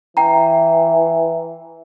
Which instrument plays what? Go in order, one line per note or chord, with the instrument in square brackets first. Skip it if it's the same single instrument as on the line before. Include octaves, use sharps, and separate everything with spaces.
[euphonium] E3 [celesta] G5 A#5